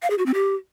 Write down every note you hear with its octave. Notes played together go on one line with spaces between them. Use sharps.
F5
G#4
F#4
C4
G4